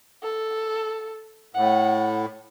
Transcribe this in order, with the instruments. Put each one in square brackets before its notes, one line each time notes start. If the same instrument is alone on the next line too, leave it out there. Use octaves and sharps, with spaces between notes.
[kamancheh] A4
[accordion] A2 [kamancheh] F#5